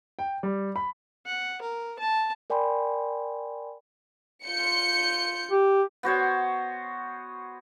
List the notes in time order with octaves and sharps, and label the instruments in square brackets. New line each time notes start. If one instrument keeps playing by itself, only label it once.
[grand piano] G5
G3
B5
[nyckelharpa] F#5
A#4
A5
[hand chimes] A#4 D5 G5 G#5 B5 C6
[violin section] F4 G6 C#7
[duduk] G4
[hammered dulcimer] B3 F#4 C5 C#5